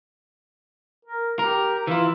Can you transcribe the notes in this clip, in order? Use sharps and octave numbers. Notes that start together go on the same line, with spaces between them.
A#4
G4 A#4
E3 E4 F4